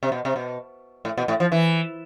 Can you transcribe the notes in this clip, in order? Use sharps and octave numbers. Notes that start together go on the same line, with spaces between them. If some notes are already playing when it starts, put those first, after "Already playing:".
C3
B2
C3
B2
A2
B2
A2
F3
E3